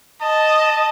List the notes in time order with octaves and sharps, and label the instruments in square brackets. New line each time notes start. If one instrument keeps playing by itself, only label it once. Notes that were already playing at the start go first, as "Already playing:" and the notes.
[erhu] D#5 [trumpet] A5